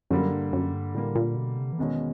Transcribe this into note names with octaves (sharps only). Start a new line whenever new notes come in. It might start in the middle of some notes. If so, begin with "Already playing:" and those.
F#2 D3 G3 A#3
G2
F#2
G2
A2 D3 G3 A#3
A#2
B2
C3
E3
E2 B2 D#3 G#3 C#4